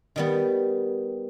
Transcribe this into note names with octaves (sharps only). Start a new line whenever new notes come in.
D#3 G3 B3